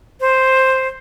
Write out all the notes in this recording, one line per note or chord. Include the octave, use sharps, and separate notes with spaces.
C5